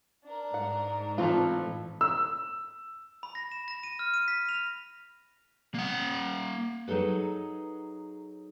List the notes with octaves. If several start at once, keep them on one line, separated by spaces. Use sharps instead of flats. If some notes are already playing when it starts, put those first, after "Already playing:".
D4 A#4
G#2 F#5
A2 E3 A3 C4 F4 A4
E6
B5
A#6
E7
A#6
D#7
F6
D#7
B6
F7
A#3 F#5
F#3 D#4 G#4 A4 B4